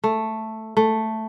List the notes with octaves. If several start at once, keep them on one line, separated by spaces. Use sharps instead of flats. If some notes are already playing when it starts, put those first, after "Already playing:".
A3
A3